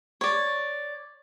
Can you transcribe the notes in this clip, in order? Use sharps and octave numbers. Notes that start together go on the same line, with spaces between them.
C#5 D5